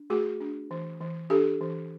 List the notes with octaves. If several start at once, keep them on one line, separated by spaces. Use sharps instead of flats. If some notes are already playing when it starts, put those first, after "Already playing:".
Already playing: D4
A3 F#4 G#4
D4
E3
E3
D4 G4 A4
E3